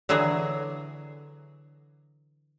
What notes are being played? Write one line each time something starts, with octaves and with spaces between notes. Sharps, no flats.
D3 E3 F#3 G#4